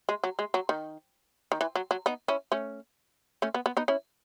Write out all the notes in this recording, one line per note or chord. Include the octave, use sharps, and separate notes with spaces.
G#3
F#3
G#3
F#3
D#3
D#3
E3
F#3
F#3
B3 D#4
C#4 E4
A3 C#4
A3 C#4
B3
B3
B3 D#4
C#4 E4